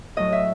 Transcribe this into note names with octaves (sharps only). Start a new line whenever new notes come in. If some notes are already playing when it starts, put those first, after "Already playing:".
A2 F#3 D#5
E5